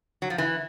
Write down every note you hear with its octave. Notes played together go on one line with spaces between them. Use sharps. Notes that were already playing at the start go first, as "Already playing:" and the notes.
F#3
F3
E3